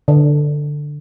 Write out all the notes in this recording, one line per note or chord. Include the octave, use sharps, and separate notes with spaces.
D3